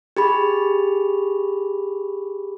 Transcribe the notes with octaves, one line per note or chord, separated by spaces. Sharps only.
G4 G#4 B5